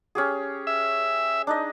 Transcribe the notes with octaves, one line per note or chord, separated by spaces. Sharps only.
C#4 G4 G#4
E5
D4 D#4 D#5